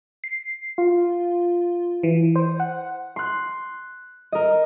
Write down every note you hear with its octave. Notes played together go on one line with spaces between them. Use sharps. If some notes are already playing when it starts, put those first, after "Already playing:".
C7
F4
E3
C5
F#5
C6 F#6
A#4 D#5